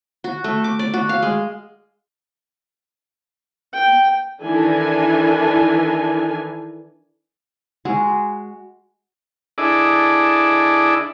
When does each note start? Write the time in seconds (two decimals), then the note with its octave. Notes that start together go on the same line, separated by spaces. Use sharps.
0.24 F#4
0.44 A3
0.64 D6
0.79 D5
0.94 F#4
1.09 F5
1.23 G#3
3.74 G5
4.42 D#3 E3 D4 A4 G#5
7.85 G#3 F#4
9.58 D4 E4 G#4 A4 D5 D#5